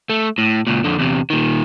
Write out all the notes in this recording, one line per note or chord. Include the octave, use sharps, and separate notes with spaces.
A3
A2
C#2 A#2
F2 D3
E2 C3
A#2 D#3